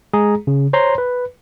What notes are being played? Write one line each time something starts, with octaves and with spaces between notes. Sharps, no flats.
G#3 G#4 A#5
C#3
C5 C#5 A#5 C6
B4